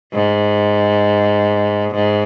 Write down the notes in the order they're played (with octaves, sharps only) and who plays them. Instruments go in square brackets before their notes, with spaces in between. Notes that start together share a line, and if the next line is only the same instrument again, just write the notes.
[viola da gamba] G#2
G#2